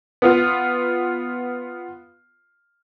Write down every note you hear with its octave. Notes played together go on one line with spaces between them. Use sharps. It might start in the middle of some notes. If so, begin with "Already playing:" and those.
B3 F4